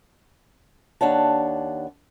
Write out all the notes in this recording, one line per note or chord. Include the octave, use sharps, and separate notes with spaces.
D#2 D4 C#5 F#5 A5